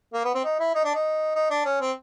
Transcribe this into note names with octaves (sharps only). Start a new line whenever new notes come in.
A#3
B3
C4
D#4
E4
D#4
D4
D#4
D#4
D4
C#4
C4